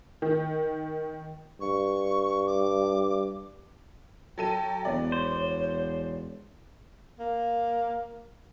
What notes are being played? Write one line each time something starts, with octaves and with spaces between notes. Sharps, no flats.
D#3
G2 C#6
D6
F#3 A4 G5 D#7
E1 B3 C#5 D5
C5
A#3